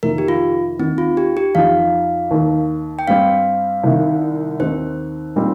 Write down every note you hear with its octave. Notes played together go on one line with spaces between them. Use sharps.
F2 C3 D#3 A#3 D#4 A#4
G4
F4
D#2 D#3 A#3 C4 D#4
F4
G4
G4
F2 F3 D#4 F5
D#2 D#3 A#3
G5
G2 G3 C4 F5
C2 C3 D#3
D#2 D#3 C4 D#4 C5
A#2 G3 C4 D#4